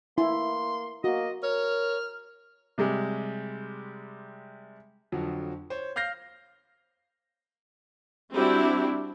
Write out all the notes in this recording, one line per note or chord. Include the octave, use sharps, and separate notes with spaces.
A#3 E4 C6
A#3 F#4 D#5
A#4 C#5 F6
C3 G3 G#3
F2 D3 F3 F#3
C5 C#5
F5 F6 G6 A#6 C7
G3 C4 D4 E4 F#4 G4